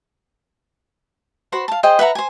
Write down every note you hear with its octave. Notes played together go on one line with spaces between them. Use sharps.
F#4 C5 B5
F5 A5
G#4 C5 D#5 G5
B4 E5 F#5 A#5
C5 G#5